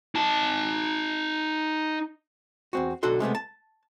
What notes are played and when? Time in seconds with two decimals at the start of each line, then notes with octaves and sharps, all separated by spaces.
0.15 D#4 A5
2.73 E2 C4 F#4
3.03 B1 D3 F#4 A4 C6
3.20 C3 G#3 A3 B3
3.35 A5